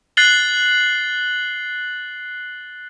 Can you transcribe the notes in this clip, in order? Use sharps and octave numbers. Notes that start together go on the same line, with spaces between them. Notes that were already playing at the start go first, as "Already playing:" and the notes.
F#6 A6 C7 F#7 G7